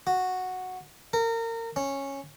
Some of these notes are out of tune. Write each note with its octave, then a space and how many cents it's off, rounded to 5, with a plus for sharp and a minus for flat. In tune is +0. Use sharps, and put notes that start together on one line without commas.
F#4 -5
A#4 -30
C#4 -10